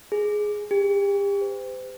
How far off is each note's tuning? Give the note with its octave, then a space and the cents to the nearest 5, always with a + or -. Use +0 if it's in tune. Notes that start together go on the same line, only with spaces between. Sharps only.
G#4 +5
G4 +35
C5 -40